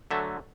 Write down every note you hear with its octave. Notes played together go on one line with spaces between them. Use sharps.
D3 F#3 A3 E5